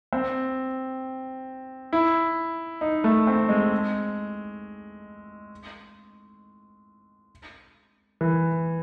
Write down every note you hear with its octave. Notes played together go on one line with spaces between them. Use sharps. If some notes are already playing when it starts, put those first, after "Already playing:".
C4
E4
D#4
A3
C4
G#3
E3